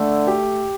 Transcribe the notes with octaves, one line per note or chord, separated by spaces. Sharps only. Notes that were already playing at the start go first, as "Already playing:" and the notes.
Already playing: D3 A3
G4